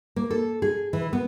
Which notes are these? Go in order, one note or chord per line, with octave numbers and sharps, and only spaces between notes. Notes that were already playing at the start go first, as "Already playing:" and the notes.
A#3
A4
G#4
E3
B3